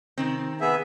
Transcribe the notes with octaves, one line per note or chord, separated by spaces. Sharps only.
C3 D#3 C4
B3 G#4 E5